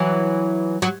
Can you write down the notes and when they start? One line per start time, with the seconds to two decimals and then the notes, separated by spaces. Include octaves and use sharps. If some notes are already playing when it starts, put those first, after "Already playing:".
Already playing: E3 F#3
0.82 F#3